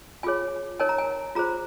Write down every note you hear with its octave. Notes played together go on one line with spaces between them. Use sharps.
F4 G#4 C#5 G#5
D#4 A#4 C#5 G#5
A#5
G#5
F4 G#4 C5 A#5